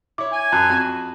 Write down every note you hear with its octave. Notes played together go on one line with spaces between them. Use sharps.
E4 C#5 D6
G#5
F#2 A5 F#6
F2 F#4